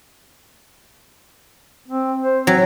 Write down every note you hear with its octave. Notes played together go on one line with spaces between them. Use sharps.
C4
C5
F#3 C4